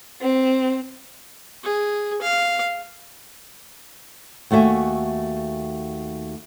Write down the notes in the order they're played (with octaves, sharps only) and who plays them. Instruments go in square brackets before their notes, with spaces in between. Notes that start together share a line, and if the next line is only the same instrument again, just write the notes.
[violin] C4
[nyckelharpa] G#4
F5
[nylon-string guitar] D#2 A3 F#4 E5 G#5